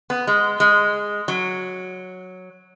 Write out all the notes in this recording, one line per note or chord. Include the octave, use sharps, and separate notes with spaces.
B3
G#3
G#3
F#3